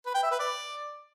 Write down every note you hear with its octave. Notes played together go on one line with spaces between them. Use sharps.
B4
G5
E5
B4
D5